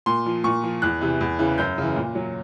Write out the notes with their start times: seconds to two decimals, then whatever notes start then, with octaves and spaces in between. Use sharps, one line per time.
0.06 A#2 C6
0.26 F3
0.44 A#2 C#6
0.64 F3
0.82 E2 F#6
1.01 C3 E3
1.21 E2
1.39 C#3 E3
1.58 F#2 G6
1.78 C#3 E3
1.96 A#2
2.15 F#3